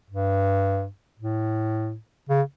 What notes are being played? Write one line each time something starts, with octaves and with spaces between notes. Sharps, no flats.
G2
A2
C#3